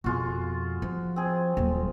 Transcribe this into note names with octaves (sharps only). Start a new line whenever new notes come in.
F2 B2 G#3 F4 F#4
F3
C4 G#4
D#1 F#3